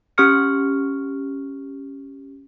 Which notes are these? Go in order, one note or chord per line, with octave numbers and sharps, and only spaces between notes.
C#4 G4 C#6 F6 C#7